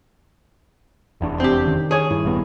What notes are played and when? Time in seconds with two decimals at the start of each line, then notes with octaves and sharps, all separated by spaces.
1.21 F1 E2 D4
1.40 C4 G4
1.66 D#3 C#4
1.91 G#4 C#5
2.11 G2 E4
2.24 A#1 G2 B3